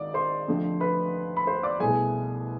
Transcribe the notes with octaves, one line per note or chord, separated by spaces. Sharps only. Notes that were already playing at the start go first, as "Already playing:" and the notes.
Already playing: G#1 G#2 D5 D6
C5 C6
F1 F2 D3 A3
B4 B5
B5
C5 C6
D5 D6
C2 B2 A3 G#4 G#5